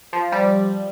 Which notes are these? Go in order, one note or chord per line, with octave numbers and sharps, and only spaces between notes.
F3
G3